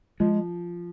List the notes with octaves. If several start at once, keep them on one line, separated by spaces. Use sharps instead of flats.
F3 G#3